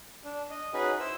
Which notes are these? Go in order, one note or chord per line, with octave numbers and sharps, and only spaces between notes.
D4
D#5
C#4 D#4 F#4 G#4 B4
E4 C5 E6